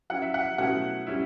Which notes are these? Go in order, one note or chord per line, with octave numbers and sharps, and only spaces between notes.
F#3 C#4 E4 F#5
E5
F#5
B2 F#3 A3 C#4 E4 F#5
G3 C#4 E4